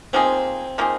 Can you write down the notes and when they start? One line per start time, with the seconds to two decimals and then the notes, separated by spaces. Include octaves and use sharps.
0.13 F3 A#3 C4 D#4 G#4
0.78 F3 A#3 D#4 G#4